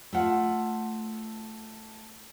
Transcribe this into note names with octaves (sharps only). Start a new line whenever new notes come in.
A3 F4 F#5